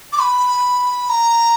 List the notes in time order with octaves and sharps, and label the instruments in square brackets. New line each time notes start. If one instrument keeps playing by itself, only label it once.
[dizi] D6
B5
A#5